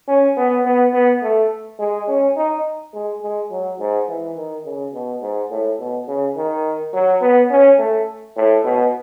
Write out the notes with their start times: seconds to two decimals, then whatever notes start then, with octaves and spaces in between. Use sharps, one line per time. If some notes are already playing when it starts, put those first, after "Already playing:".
0.08 C#4
0.37 B3
0.66 B3
0.94 B3
1.22 A3
1.79 G#3
2.08 C#4
2.37 D#4
2.94 G#3
3.22 G#3
3.51 F#3
3.79 G#2
4.08 E3
4.36 D#3
4.65 C#3
4.93 B2
5.22 G#2
5.51 A2
5.79 B2
6.08 C#3
6.36 D#3
6.94 F#3
7.22 B3
7.50 C#4
7.79 A3
8.36 A2
8.64 B2